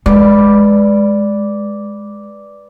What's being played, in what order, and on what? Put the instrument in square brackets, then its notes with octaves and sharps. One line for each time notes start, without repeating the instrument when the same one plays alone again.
[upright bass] G#3 [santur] B4 D5